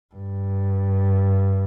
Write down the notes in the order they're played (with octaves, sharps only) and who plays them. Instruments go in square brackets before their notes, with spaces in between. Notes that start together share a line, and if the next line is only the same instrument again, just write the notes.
[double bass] G2